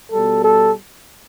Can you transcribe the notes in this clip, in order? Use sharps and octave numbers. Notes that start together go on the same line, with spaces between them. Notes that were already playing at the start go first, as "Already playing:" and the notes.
B2 G3 A4
A4